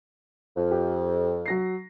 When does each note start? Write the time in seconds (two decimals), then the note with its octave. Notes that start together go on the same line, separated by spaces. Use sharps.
0.57 F2
0.71 G4
1.46 F#3 A#6 C7